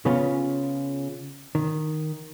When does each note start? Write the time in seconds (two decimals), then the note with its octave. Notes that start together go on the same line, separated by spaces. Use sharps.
0.05 C#3 B3 C#4 F4
1.55 D#3